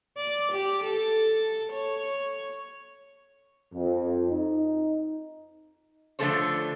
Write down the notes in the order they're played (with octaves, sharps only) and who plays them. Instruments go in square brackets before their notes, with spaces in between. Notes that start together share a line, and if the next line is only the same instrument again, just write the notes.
[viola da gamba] D5
G4
A4
C#5
[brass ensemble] F2
D#4
[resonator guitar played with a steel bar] D3 F3 A3 A4 C5 C#5